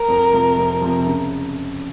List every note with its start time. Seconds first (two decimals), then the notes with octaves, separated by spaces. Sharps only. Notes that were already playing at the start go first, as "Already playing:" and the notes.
Already playing: A#4
0.08 F2
0.33 C3 F3
0.58 F2
0.81 C3 F3
1.07 C#3